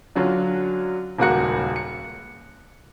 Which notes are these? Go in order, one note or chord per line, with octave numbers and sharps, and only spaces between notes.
D3 F#3 C#4 F4
D#1 C#2 A#3 F#4 F#6 C#7
C#7